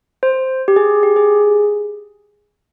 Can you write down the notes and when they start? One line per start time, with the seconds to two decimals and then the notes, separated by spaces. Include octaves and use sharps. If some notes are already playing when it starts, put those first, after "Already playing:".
0.23 C5
0.68 G4
0.76 G#4
1.03 G4
1.16 G#4